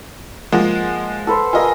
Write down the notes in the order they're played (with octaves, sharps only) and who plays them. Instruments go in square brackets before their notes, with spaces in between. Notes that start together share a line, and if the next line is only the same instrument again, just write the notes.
[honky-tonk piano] F3 G#3 A#3 [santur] F#5
[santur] A4 B4 C5
[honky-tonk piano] F4 D#5 [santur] G#4 A#4 G#5